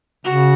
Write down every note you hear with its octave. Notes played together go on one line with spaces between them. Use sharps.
C#3 F#4